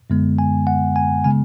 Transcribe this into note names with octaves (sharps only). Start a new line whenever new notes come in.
F#2 D3 G#3 B3
G#5
F#5
G#5
C#3 G#3 B3 G#5